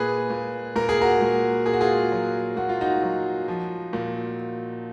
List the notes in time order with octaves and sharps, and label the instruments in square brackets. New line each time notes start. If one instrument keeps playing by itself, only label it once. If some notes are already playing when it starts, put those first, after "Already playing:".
Already playing: [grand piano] A#2 G#4 B4
A#2
A#2 A#4
G#4
F#4 A#4
A#2
A#2 G#4
F#4
F4 G#4
F#3
A#2 F#4
F4
D#4 F#4
F#3
F3
A#2